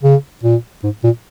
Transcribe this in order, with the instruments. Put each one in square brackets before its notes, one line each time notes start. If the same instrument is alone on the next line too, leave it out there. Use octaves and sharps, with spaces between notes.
[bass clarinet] C#3
A#2
G#2
A#2